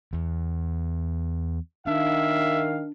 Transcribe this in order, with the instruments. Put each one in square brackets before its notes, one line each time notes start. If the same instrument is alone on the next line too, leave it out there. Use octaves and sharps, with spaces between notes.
[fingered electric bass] E2
[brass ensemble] D#3 F5 [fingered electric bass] D4 [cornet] E5